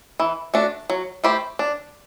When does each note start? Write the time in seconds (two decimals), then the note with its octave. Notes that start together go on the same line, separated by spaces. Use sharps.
0.20 E3
0.54 A3 D4 F#4
0.90 F#3
1.24 A3 E4 G4 C5
1.59 D4